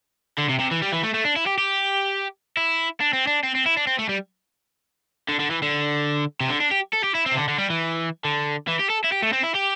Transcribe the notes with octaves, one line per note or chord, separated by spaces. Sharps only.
D3
C3
C3
E3
G3
E3
A3
A3
D4
E4
G4
G4
E4
D4
C4
D4
C4
C4
E4
D4
C4
A3
G3
D3
D3
E3
D3
C3
D3
D4
G4
A4
G4
E4
C4
C3
D3
D3
G3
E3
D3
E3
G4
A4
E4
G4
A3
C4
E4
G4